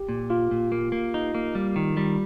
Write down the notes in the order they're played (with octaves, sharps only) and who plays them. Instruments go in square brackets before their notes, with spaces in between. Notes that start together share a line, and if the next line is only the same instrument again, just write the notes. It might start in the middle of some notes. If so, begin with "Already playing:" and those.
Already playing: [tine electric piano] G4
[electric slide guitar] A#2
[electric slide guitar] A#3 [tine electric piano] F4
[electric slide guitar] A#2
A#3
A#3
D#4
A#3
G3
D#3
G3